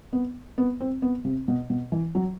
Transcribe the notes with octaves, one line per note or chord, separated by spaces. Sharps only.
B3
B3
C4
B3
C3
B2
B2
E3
F#3